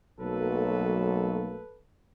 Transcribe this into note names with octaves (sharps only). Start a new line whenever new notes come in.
B1 F#3 A3 A#3 A4 B4